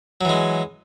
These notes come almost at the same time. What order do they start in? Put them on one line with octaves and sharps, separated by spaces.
F#3 E3 G#3